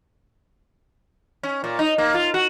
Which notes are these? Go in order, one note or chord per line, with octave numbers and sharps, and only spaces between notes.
C#4
A#2
D#4
A#3
F4
F#4